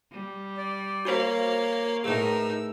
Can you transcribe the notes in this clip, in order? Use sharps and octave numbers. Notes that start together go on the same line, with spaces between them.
G3
D5
A#3 F#4 C5 C#5 F5
A2 D#4 G#4 A#4 B4 E6